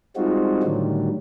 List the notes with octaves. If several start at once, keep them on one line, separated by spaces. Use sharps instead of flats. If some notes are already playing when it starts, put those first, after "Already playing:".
G3 G#3 C4 D#4 F4 F#4
A2 D3 D#3 F#3 G3